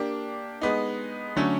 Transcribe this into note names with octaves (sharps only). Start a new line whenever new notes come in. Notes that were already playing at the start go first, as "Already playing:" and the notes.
Already playing: A#3 D4 G4
G#3 B3 D#4
D3 F#3 A3 C#4